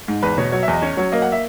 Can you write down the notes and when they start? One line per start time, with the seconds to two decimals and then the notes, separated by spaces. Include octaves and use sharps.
0.08 G#2
0.23 E2 B4
0.38 B2 C#5
0.52 F#3 C#5
0.63 E5
0.68 E2 D#5
0.82 C#4 C#5
0.97 F#3 C#5
1.12 A#3 D#5
1.22 F#5
1.32 E5